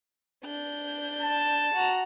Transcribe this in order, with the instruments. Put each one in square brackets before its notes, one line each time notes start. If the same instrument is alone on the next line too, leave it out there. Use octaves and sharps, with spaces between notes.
[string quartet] D4 G6
[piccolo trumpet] A5
[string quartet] F#4 A#5